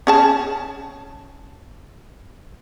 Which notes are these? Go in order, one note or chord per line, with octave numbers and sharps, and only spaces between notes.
C#4 G#4 A5